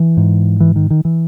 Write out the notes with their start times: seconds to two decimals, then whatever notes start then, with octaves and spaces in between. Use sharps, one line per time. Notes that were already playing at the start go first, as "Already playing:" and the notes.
Already playing: E3
0.17 G#2
0.60 E3
0.76 D#3
0.90 D#3
1.05 E3